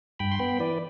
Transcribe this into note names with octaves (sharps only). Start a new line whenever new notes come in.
G2 G5 B5
C6
B3 G5 B5
E3 B4 D5